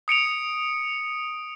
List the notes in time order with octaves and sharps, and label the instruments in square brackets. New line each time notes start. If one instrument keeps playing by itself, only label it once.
[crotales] D#6 C#7 D7 F7